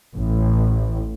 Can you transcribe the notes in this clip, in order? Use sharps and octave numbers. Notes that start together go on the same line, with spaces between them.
A1